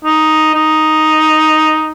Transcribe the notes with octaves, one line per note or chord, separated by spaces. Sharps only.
D#4
D#4